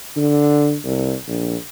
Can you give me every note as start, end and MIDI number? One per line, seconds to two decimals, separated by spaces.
0.16 0.76 50
0.84 1.14 36
1.28 1.56 34